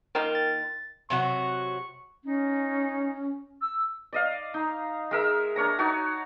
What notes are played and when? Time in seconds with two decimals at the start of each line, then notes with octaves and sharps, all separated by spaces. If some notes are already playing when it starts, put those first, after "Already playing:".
0.15 D#3 A#3 F4 A#4 G5
0.35 A6
1.10 C3 F#3 F#4 C#6
2.25 C#4 D#4
3.61 E6
4.13 D5 D#5 F5
4.54 D#4
5.11 G#3 A#4 E5
5.56 D4 A#4 C#5 A#5
5.79 D#4 F#4 C#5 A5